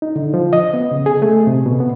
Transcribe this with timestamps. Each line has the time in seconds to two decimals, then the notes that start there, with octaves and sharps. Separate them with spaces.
0.02 D#4
0.16 D3
0.34 F3
0.53 D#5
0.74 B3
0.91 C#3
1.06 G#4
1.22 A3
1.47 C3
1.66 B2
1.80 B3